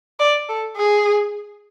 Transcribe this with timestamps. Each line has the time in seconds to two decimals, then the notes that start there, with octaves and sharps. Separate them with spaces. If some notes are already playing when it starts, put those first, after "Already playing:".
0.20 D5
0.49 A4
0.77 G#4